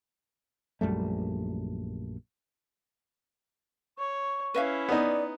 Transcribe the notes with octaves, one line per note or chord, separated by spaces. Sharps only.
A#1 F#2 G3 A3
C#5 C#6
C#4 E4 B4 E5 F5
B3 D#4 D5